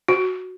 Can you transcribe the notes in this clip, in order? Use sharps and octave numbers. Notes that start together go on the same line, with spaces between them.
F#4